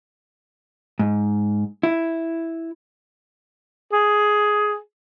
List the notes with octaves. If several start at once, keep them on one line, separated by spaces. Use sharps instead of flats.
G#2
E4
G#4